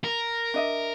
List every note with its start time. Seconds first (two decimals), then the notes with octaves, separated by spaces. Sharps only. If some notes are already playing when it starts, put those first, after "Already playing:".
0.04 A#4
0.54 D4 D#5 E5